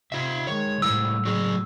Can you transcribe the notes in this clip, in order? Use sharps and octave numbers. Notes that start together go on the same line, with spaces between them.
C3 F4 E5
D#3 G#3 C#5
A2 G3 E4 E6
F#3 G#4